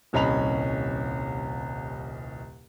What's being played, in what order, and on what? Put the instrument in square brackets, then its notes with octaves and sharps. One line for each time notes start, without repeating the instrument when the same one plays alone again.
[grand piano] D#1 C2 C#4 D#5 B5 F7